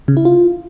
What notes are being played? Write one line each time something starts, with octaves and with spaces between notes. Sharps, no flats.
C#3
E4
F4